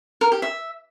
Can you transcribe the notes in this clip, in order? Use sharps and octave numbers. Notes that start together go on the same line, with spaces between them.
A#4
G4
E5